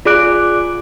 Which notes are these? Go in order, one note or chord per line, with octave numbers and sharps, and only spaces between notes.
F4 G#4 D5 D6 F#6 D7